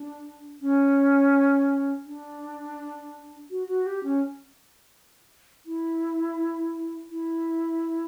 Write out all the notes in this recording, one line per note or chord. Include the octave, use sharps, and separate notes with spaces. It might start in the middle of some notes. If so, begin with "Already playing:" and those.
Already playing: D4
C#4
D4
F#4
F#4
G4
C#4
E4
E4